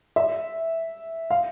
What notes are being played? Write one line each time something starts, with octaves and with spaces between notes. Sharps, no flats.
E5
F5